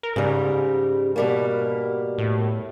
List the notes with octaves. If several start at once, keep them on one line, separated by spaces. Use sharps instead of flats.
A#4
G#2 C#3 G3
B2 G3 A#3
A2